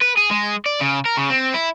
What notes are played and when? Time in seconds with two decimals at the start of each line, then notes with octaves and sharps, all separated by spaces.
0.01 B4
0.17 G#4
0.30 G#3
0.66 D5
0.81 C#3
1.06 A#4
1.17 C#3
1.30 C4
1.54 E4